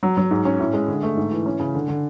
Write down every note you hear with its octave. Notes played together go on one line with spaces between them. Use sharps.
F#3
F#3
G#2
C#4
A2
G#3
D3
A3
G#2
E3
C#4
C#3
D3
D3